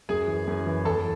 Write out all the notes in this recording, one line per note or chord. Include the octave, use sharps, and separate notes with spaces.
F#2 G#4 G#5
E3
F#2
E3
E2 A4 A5